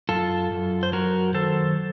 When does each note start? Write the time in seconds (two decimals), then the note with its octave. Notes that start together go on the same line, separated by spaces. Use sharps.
0.09 F#2 F4 A4
0.52 F#2
0.83 C5
0.92 F#3 F#4 A#4
1.34 D#3 A4 C5